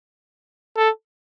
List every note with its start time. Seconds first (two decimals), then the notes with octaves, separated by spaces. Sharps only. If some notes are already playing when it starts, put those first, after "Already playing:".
0.77 A4